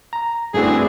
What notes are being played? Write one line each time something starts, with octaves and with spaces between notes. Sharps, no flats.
A#5
G2 E3 A3 C4 D4 F#4 G#4